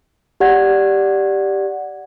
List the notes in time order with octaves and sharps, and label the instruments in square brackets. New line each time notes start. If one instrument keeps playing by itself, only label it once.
[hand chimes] G4 D5 F#5 G#6